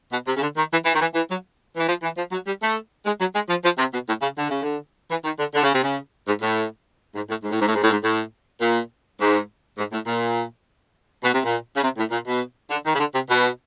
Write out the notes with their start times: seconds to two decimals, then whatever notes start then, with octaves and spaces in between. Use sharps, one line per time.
0.11 B2
0.26 C3
0.35 C#3
0.40 D3
0.55 D#3
0.70 E3
0.84 E3
0.94 D#3
0.99 E3
1.13 E3
1.28 F#3
1.76 E3
1.87 F3
2.01 E3
2.16 F3
2.31 F#3
2.45 G3
2.60 A3
3.04 G#3
3.18 F#3
3.33 G#3
3.48 F3
3.62 F3
3.77 C3
3.92 B2
4.06 A2
4.21 C#3
4.35 D3
4.48 C#3
4.61 D3
5.08 E3
5.23 D#3
5.38 D3
5.52 D3
5.62 C#3
5.72 C3
5.82 C#3
6.26 G#2
6.40 A2
7.14 G#2
7.28 A2
7.43 G#2
7.50 A2
7.58 G#2
7.66 A2
7.73 G#2
7.81 A2
7.89 G#2
8.01 A2
8.59 A#2
9.19 G#2
9.77 G#2
9.91 A2
10.06 A#2
11.23 B2
11.32 C3
11.43 A#2
11.74 C#3
11.82 C3
11.96 A2
12.10 A#2
12.26 B2
12.69 D3
12.84 D#3
12.94 C#3
12.98 D3
13.13 C3
13.28 B2